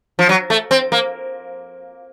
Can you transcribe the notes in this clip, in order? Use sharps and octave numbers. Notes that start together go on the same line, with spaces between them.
F3
F#3
A3
C4
A#3